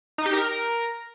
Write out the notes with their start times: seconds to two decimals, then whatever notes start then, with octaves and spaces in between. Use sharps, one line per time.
0.18 D#4
0.26 G4
0.33 A#4